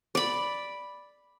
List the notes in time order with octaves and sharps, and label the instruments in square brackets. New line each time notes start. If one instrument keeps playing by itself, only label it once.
[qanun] D5 B5